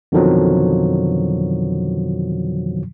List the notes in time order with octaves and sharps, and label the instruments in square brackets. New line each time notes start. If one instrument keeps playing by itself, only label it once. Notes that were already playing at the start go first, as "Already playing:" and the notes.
[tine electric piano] F2 B2 D3 D#3 F3 F#3